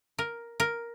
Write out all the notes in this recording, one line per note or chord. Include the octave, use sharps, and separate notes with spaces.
A#4
A#4